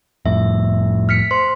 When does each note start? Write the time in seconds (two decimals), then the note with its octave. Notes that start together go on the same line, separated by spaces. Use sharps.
0.26 F2 A2 E5
1.09 F6 B6 C#7
1.31 C5 C6